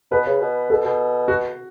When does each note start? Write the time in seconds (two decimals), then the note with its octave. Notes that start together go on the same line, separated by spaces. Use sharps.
0.11 B2 B4
0.26 C#3
0.41 B2
0.70 B2 A4
0.85 B2
1.28 F#4